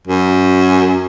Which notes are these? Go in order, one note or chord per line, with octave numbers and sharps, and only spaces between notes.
F#2